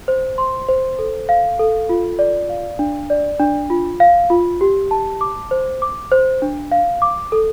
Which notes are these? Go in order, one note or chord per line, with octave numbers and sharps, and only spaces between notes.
C5
C6
C5
A4
F5
A4
F4
D5
F5
D4
D5
D4
F4
F5
F4
G4
A5
D6
C5
D6
C5
D4
F5
D6
A4